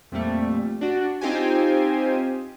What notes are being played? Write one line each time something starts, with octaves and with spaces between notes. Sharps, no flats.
F2 A#2 G3 A3
D4 F#4
C4 D#4 F4 G4 C5 G#5